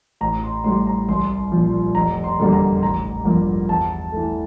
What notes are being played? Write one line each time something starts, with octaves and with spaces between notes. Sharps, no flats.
A1 A#5
C6
A2 G3 C6
A#5
C2 C6
A#2 F3
F1 A#5
C6
E2 D3 G3 A#3
A#5
A1 A#5
G2 F3 A#3
E2 A5
E3 A3